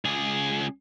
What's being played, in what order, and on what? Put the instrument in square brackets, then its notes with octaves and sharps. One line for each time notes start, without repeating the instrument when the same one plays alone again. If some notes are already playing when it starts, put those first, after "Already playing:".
[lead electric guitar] C#2 G#4